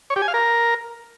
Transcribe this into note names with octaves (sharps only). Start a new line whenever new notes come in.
C#5
G4
G#5
F5
A#4